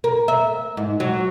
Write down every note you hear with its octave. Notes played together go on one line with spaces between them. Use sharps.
A#4
E5
G#2
F#3